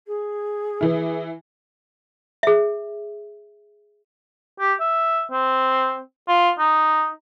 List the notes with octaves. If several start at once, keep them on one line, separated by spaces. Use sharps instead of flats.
G#4
E3 E4
G#4 E5
G4
E5
C4
F4
D#4